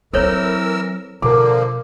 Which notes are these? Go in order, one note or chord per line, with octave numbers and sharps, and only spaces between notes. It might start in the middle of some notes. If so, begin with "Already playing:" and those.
E3 F#3 C4 A4 A#4 C5 C#5 E6
B2 D3 F3 A#3 A#4 D6